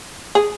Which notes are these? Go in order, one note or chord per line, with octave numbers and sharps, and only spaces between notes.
G#4